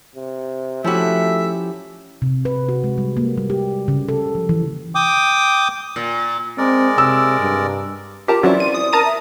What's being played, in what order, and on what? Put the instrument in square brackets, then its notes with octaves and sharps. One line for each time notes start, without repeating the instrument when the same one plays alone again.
[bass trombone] C3
[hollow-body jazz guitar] F3 F#4 [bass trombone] A3 [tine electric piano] C#4 E4 G4 [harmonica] E5
[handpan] C3
B4
F#4
G#3
G3
A#3
G3
G4
C#3
A4
F3
E3
[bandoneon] G5 D6 D#6
[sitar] A#2
[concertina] G#3 A#4 D5 [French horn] C4
[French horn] C3 [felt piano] E6
[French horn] G2
[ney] F4 [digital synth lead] G4 [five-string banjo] A#4 A5 A#5
[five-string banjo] E3 C4 E4 [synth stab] F#3 C#4 [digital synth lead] F4 [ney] D5
[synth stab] D#7
[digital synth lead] D#6
[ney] A#4 [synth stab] A5 A#5 D#7
[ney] E5